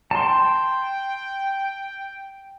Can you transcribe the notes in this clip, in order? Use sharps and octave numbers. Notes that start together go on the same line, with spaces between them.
G5 A5 C6